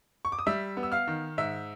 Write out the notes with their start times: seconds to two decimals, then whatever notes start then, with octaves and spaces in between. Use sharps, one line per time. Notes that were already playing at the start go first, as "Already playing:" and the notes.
0.25 C#6
0.32 D6
0.39 D#6
0.46 G3 E5 E6
0.77 B3
0.83 E6
0.92 F5 F6
1.07 D#3
1.38 G#2 E5 E6